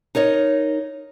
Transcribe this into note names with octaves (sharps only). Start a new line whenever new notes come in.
D#4 A#4 C#5 D#5